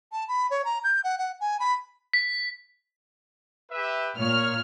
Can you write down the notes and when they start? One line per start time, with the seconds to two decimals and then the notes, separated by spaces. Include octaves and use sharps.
0.12 A5
0.28 B5
0.51 C#5
0.65 A#5
0.84 G6
1.04 F#5
1.18 F#5
1.40 G#5
1.60 B5
2.13 B6
3.72 G4 B4 E5
4.18 A#2 C#5 F6